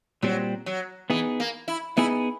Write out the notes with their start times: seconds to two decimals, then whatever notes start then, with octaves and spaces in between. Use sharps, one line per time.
0.22 A#2 F#3 G3 C4
0.66 F#3
1.10 E3 B3 D#4 G#4
1.40 A#3
1.68 E4
1.97 B3 D#4 E4 G#4